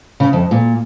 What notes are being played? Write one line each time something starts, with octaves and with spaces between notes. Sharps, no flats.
C#3
F2
A#2